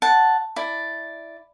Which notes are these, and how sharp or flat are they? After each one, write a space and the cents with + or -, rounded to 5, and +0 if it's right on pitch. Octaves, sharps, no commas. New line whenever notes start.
F#5 +0 A5 +0
E4 +0 D5 +0